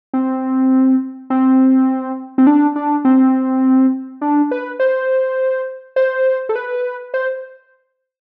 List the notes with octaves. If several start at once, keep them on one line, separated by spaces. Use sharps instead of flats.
C4
C4
C4
D4
D4
C4
D4
B4
C5
C5
A4
B4
C5